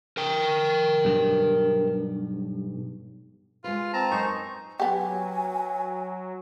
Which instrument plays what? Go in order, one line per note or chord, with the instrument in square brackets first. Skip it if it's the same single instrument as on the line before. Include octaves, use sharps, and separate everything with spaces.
[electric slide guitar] A#4 G5
[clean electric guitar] B1 G2
[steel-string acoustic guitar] G#3 B4 [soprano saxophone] F4
[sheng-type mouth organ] C4 A5 [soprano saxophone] A#5
[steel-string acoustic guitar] F#2 A#4 G#5 [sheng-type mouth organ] D#4 C5 C#6
[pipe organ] F#3 [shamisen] B3 G4 [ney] G#5